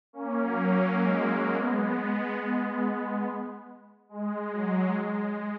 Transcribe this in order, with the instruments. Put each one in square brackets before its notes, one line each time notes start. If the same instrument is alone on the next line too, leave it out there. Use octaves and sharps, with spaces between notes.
[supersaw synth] A#3 C#4
F#3 A#3
F#3
G#3
F#3 A#3
G#3 B3
G#3
F#3
G#3